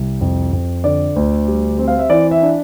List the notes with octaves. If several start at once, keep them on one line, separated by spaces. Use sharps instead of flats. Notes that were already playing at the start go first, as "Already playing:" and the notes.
Already playing: C2
F2
F2
D3 D5
D2
G3
C4
F5
E5
E3 D5
E5
D4